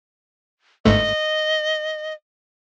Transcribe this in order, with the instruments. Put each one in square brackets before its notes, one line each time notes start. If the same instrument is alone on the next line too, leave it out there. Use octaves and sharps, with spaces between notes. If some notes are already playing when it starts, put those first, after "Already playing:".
[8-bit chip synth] G1 G#2 A3 [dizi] D#5